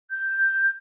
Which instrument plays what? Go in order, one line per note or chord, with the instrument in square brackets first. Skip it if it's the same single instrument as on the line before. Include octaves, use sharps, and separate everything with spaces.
[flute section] G6